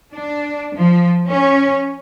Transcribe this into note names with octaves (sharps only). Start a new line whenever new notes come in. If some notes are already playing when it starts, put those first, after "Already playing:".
D4
F3
C#4